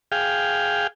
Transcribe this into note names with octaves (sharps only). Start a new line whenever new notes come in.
G#4 F5 G5